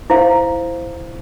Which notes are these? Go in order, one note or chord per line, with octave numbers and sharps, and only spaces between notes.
E4 C5 F5